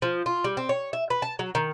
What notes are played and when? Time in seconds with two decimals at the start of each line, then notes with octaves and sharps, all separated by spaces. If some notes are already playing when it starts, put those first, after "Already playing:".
0.02 F3
0.26 F4
0.44 G3
0.57 C4
0.69 C#5
0.93 E5
1.10 B4
1.22 A5
1.39 F#3
1.55 D#3